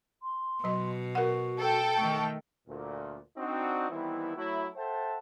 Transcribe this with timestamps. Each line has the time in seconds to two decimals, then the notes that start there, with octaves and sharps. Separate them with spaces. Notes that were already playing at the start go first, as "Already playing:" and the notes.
0.23 C6
0.64 B2 F#3 D#5
1.15 F#4 A#4 F#5
1.59 A4 G5
1.98 D#3 A3 C#6
2.68 D2 A#2
3.38 C4 D4 D#4 F#4
3.90 D#3 E3 G3 B3 C4 E4
4.36 F#3 A3 E4
4.76 A4 C5 E5 F#5 G5 A5